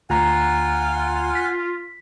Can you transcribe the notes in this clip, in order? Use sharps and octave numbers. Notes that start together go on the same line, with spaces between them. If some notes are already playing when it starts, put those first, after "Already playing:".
D2 F4 F#5 G#5 A#5
B6